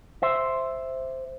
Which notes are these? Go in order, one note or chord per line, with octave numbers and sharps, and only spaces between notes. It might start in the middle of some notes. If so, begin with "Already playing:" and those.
C5 E5